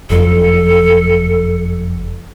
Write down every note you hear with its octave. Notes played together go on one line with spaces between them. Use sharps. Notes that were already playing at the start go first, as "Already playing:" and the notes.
F#1 F2 A4